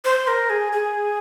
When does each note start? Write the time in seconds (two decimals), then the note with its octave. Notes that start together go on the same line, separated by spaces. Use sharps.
0.05 C5
0.27 A#4
0.50 G#4
0.73 G#4